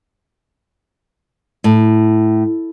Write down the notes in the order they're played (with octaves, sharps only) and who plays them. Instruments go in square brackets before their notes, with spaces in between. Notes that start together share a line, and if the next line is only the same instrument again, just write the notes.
[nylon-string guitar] A2